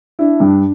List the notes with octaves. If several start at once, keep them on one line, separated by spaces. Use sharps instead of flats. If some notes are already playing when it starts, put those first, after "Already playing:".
D4 E4
G2